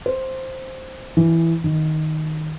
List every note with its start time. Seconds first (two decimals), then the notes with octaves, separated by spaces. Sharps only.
0.06 C5
1.17 E3
1.64 D#3